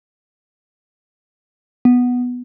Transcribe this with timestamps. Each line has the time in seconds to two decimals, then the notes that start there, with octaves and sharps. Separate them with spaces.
1.85 B3